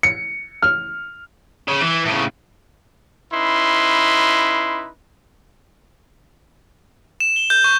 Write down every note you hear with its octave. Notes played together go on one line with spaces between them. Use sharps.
C#7
F6
C#3
E3
A2 C#3
C#4 D#4 E4 B4 C6
E7
G7
G6
C#6